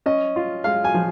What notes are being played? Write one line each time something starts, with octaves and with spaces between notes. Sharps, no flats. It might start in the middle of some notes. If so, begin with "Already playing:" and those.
C#4 D#5
F4
G#3 F5
G#5
F3